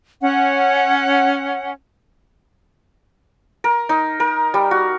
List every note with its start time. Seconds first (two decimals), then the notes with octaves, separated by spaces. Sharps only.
0.22 C#4 F#5
3.64 A#4
3.89 D#4
4.20 A#4
4.54 G3
4.71 F#4